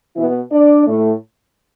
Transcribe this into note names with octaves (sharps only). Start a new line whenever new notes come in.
B2 E3 B3 E4
D4 D5
A2 A3